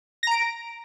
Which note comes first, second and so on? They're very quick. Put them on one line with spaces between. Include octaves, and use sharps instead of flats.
A#6 A#5 D7